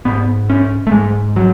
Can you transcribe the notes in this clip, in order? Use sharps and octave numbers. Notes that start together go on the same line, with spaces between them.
G#2 B3
C#4
A3
G#2 G#3
F#3